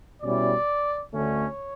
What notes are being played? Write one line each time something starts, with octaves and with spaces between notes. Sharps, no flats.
B2 G3 C#4 E4 D5
D2 D3 A3 C#4 C#5